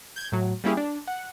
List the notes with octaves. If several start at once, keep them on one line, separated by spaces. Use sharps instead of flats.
G6 G#6
A2 F#3
G3 A#3 C#4 E4 G4 G#4
D4
F#5